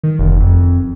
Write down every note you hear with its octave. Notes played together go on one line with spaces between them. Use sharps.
D#3
F1
F2